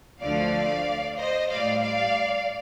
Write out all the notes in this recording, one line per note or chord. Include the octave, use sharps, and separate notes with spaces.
D2 D3 F3 A3 D5 F5
C5 D#5
A2 G3 D5 F5
D5 F5